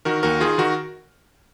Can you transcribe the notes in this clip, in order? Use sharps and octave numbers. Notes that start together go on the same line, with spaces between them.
D#3 F#4 A#4
D#2 F#4 A#4
D#3 F4 G#4
D#3 F#4 A#4